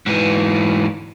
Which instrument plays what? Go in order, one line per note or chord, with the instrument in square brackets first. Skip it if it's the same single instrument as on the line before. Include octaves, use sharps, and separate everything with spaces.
[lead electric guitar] G#2 E3